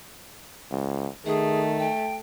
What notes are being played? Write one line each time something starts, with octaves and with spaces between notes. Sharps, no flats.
C#2
D#3 A3 G#4
G5